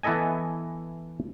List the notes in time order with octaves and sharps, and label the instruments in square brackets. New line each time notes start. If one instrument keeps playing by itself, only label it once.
[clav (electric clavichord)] E3 B3 E4 A4 D#5 G#5